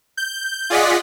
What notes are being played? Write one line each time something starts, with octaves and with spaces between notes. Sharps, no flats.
G6
F4 G#4 D5 D#5 F#5 B6